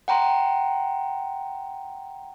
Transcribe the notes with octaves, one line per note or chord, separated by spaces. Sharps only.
F#5 G5 A#5 C6